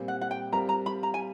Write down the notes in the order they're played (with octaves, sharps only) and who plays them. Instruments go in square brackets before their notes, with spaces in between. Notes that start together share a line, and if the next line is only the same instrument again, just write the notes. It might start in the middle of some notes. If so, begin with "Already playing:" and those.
Already playing: [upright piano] A#2 G3 C4
[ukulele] F#5
F#5
G5
[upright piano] G3 C4 F4 A#4 [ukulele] A#5
[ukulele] A#5
B5
A#5
G#5